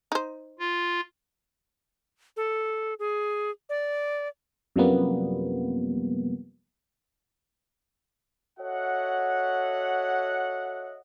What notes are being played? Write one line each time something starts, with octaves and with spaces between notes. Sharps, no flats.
D#4 C5
F4
A4
G#4
D5
F#2 C3 F3 G3 A#3 B3
F#4 A4 C#5 D#5 E5 F#5